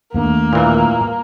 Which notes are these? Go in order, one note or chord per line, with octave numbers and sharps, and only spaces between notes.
D#2 A3 A#3 D4
A#2 E3